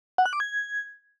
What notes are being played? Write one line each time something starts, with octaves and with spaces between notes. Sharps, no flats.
F#5
F#6
D6
G#6